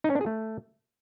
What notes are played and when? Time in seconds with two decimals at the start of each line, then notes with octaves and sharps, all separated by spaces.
0.04 D#4
0.10 C#4
0.15 D4
0.21 G#4
0.26 A3